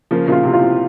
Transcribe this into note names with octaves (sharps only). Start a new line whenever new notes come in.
C#3 F3 A#3
A#2 C#3 F4
A2 C3
F4
A2 C3